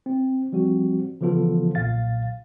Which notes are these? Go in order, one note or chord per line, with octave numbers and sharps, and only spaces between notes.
C4
F3 G3 C4 F#4
C#3 E3 F3 B3 F4 A4
B1 A#2 F5 A6